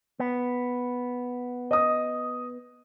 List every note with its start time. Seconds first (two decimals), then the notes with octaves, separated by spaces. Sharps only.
0.20 B3
1.71 D#5 D#6